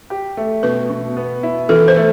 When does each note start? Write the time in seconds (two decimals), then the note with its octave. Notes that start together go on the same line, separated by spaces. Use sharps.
0.10 G4
0.37 A3
0.63 B2 B4
0.90 B2
1.17 B3
1.43 E4
1.69 E3 A4
1.88 C5
1.96 A3